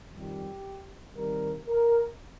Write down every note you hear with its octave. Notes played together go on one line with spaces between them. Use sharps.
F2 D#3 G3 G4
C3 D#3 G3 A#4
A#4